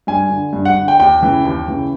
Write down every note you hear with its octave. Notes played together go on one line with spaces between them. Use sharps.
G2 G#5
D3
G2
F#5
D3
G5
D#2 G5
C#3 E3
D#2
C#3 E3